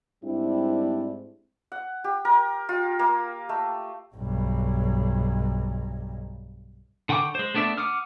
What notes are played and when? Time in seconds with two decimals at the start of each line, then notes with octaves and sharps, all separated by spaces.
0.24 G#2 G3 C4 D4 E4
1.72 F#5
2.04 G4
2.25 A#4
2.69 F4
2.99 A#3
3.49 A3
4.16 B1 G2
7.09 D3 F#5 G5 C#6 D6
7.35 G#3 C5
7.54 A3 B3 D4 D5 E5
7.78 F#5 D6 D#6 F6